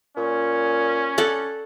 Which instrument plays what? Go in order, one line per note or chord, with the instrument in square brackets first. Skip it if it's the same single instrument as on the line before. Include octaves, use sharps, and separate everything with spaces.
[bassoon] A#2 [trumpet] C#4
[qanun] A4 D5 F#5